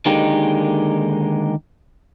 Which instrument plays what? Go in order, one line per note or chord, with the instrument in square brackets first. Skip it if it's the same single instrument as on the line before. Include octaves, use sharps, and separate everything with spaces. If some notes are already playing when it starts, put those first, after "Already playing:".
[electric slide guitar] D3 D#3 G#3 A#3 D#4 G4